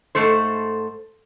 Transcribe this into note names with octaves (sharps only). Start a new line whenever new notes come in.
G#2 A3 A4 C5